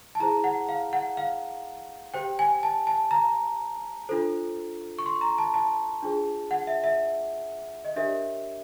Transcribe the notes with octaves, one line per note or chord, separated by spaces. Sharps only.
A5
E4 G#4 C5 A#5
F#5
F5
F#5
F5
G4 C5 G5
G#5
A5
A5
A#5
D4 F4 A4 C5
C#6
C6
A#5
A5
A5
D4 F4 G#4 C5
F#5
E5
E5
D#5
D4 G4 A#4 C#5 E5